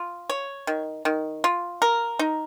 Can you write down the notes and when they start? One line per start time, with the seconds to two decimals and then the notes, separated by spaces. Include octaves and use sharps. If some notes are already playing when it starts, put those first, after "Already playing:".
Already playing: F4
0.29 C#5
0.67 D#3
1.05 D#3
1.44 F4
1.82 A#4
2.19 D#4